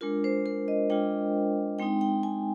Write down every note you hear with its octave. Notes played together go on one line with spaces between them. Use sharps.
G#3 D4 F4 A#4
C5
A#4
D#5
G#3 D4 F4 G5
G#3 C4 D#4 G5
G5
G#5